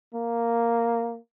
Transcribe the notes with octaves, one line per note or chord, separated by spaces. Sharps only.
A#3